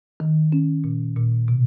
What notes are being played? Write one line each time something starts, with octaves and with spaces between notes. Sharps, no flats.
D#3
C#4
A#2
A#2
B2